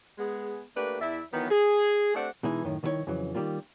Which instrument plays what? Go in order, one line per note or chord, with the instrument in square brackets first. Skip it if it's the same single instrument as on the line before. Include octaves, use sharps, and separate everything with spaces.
[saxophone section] G#3 B3 G#4
A3 A#3 D4 G4 B4
E2 E4 D5 E5
D#3 E3 F#3 B3
G#4
A3 C4 D4 G4 F#5
[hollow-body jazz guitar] B2 E3 G#3 D#4 E4
F#2 A2 D#3
C2 D#3 E4 F4 C#5 G5
F2 C#3 E3 F#3
D#3 F#3 G3 A#3 F4